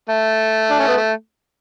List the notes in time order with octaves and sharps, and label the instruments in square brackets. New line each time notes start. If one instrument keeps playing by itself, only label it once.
[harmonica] A3
D4
C#4
B3
A3